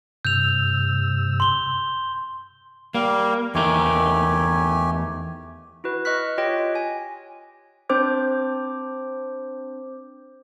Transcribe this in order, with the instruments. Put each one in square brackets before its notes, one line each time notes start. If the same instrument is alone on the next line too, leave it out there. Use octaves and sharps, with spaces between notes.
[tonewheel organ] G2 C3 E6 [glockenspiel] G6 F7
[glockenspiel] C6 G7
[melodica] G3 F5 [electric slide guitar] A#3
[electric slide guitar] E2 D#4 A#4 [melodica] A3 G4 G#5
[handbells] E4 F#4 B4
D#5 C#6 F6 F#6 B6
F4 G4 C#5 D#5 G5
G#5
C4 D4 C5 D6 G6